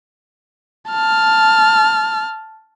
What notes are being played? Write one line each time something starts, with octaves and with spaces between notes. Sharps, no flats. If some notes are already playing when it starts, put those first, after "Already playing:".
A5 F6